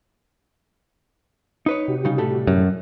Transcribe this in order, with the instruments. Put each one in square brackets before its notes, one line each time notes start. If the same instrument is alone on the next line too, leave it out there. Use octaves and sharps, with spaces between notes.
[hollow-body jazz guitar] D#4 B4 C#5
[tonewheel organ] C3 F#4 G4
[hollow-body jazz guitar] C#3 G3 D#4
A2 G3 A4
[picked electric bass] F#2